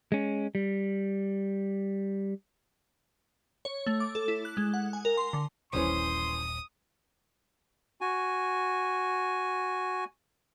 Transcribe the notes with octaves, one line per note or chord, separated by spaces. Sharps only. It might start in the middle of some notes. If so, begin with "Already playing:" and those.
G#3 C#4
G3
C#5
A3
D6
A4
E4
F#6
G#3
F#5
G#5
A#4
C6
D3
D#1 A#1 E3 C#4 C5 C6 D#6
F#4 G#5